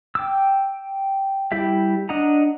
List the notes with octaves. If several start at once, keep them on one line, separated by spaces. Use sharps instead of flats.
G5 D6 E6
G3 E4 G4 E5
D4 D#5 F#5 A#5